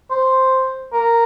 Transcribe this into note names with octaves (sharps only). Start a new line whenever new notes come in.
C5
A#4